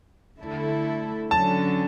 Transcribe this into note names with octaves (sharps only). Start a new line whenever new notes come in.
D3 A3 E4 A4
D3 F#3 C#4 A5